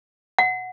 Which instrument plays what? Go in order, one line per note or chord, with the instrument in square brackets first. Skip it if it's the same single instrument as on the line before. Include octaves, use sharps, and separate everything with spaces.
[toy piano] F#5